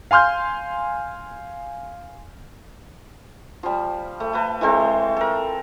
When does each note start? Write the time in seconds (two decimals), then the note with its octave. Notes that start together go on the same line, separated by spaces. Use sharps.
0.11 F5 G#5 C6 F6 G6
3.63 F3 G3
4.20 A3
4.33 A3 B4 A5
4.61 E3 G#3 A3 C4
5.16 A4 A#4